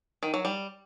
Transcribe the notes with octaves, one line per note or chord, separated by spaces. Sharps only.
D#3
F#3
G3